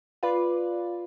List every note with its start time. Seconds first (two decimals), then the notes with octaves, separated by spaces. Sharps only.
0.23 F4 B4 D5